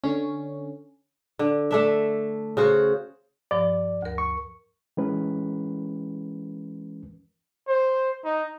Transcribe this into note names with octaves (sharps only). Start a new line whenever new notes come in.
D3 C#4
D3
A3 D4 E5
C#3 F#4 C5
G2 F3 D5
D2 A#4
C#6
E3 G#3 C#4 A#4 B4
C5
D#4